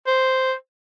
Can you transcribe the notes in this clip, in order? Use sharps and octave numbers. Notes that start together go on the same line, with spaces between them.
C5